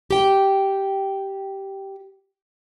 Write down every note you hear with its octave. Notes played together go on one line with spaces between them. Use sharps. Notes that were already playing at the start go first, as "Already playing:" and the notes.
G4 G5